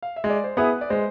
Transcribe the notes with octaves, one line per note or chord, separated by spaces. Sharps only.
F5
E5
G#3
D5
C5
B3 E4 G#4 B4
D5
G#3 C5